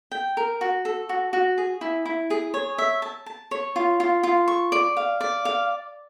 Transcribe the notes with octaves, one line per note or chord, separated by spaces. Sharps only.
G5
A#4
F#4
A4
F#4
F#4
G#4
E4
E4
G#4
C#5
E5
A5
A5
C#5
F4
F4
F4
C#6
D5
F5
D5
F5